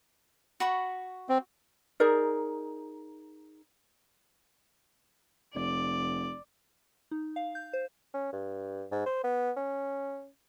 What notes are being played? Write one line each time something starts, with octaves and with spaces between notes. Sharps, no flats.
F#4 B5 C#6
C4
D#4 G#4 A#4 D5
F1 D5
D#4
F5
G6
C5
C#4
G2
G#2
C5
B3
C#4